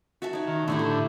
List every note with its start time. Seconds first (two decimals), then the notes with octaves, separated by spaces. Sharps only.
0.22 F#4 E5 A5
0.33 D#4 C#5
0.47 D#3
0.68 A2 D3 A3 E4 G4
0.79 A4